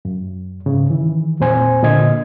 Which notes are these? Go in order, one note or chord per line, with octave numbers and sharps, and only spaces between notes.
F#2
G#2 C#3
D#3 E3
E2 A#2 C4 C5 G#5
A#2 D3 D#5 G#6